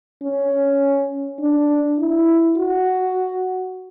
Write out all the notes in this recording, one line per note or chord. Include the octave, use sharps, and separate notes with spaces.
C#4
D4
E4
F#4